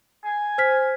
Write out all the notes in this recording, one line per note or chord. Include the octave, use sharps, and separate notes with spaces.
G#5
C5 F6 B6